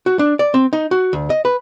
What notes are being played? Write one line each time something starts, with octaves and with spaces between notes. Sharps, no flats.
F#4
D4
D5
C4
D#4
F#4
D2
D#5
B4